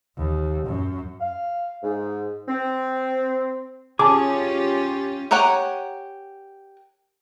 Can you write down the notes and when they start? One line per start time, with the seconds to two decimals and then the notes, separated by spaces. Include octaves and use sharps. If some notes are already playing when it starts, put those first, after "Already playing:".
0.17 D#2
0.66 F#2
1.20 F5
1.82 G#2
2.48 C4
3.99 C#4 F4 G4 G#4 A5 D6
5.31 G4 A#4 C#5 F#5 G#5